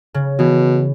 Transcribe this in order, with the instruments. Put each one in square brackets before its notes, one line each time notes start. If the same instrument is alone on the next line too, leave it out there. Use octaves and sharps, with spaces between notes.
[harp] C#3
[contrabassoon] B2 [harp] E3